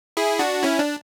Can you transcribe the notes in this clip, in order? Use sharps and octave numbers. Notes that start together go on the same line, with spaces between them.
E4 G#4
D4 F#4
C#4 E4
D4